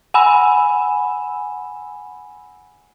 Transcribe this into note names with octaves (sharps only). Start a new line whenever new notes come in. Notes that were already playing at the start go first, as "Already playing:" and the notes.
F#5 G#5 B5 E6 E7